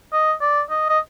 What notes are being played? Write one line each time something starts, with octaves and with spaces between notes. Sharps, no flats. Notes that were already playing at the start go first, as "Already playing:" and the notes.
D#5
D5
D#5
D#5